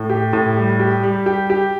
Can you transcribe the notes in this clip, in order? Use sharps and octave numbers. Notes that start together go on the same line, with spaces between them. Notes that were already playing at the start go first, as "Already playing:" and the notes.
Already playing: A2
G4
A2
G3
G4
G3
G4
G4